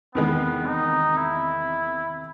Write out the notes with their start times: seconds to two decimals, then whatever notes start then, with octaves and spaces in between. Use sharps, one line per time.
0.15 E2 C3 D#3 G#3 B3
0.67 D#4
1.17 E4